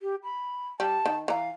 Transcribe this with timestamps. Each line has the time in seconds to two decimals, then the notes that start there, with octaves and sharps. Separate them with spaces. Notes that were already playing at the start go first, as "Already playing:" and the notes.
0.01 G4
0.24 B5
0.80 G3 A5
1.06 D#3
1.28 E3 F5 A#5